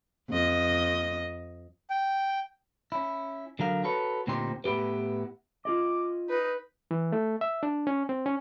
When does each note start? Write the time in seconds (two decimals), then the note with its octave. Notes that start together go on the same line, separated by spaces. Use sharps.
0.30 F2 D#5
1.90 G5
2.92 C#4 E4
3.59 D3 F#3 A#4 F5
3.84 F#4 A4 B4 C#5
4.27 D2 A#2 C4 D#4 G4 C6
4.64 A2 B3 E4 G4 B4
5.65 F4 G#4 D#5 D6
6.30 D#4 B4
6.91 E3
7.12 A3
7.41 E5
7.63 D4
7.87 C#4
8.09 C4
8.26 C#4